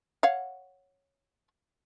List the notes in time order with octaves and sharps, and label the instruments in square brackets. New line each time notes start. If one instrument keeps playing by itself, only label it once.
[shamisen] C#5 F5 F#5